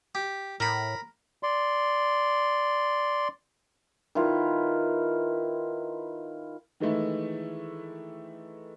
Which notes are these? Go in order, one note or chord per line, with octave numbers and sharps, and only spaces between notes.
G4
A2 A#4 B5
D5 C6
D#3 E4 F4 B4
D#3 E3 G#3 A3 E4